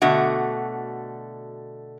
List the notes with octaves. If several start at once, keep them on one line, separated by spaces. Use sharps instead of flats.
B2 D3 A3 F#4